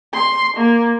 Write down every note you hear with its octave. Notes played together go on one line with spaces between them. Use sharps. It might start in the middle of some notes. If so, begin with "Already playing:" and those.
C6
A#3